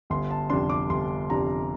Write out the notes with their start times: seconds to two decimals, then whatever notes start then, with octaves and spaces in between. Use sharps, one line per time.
0.10 G1 C6
0.31 A5
0.50 F2 C3 G3 D4 C6
0.69 D6
0.89 G1 C6
1.30 F2 C3 G3 D4 A#5